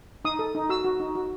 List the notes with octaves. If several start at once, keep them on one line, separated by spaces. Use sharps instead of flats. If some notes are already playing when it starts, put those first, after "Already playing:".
D#4 D#6
A4
D#4
F#4 E6
F#4
D#4
F#4